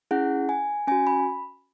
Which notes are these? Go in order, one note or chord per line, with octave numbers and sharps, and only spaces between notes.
C#4 E4 G#4 F#5
G#5
C#4 F#4 G#5
B5